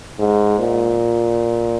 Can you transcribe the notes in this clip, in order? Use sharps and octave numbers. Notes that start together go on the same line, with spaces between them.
G#2
A#2